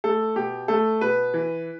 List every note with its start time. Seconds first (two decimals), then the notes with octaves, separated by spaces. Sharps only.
0.04 A3 A4
0.36 B2 G4
0.68 A3 A4
1.01 B2 B4
1.34 E3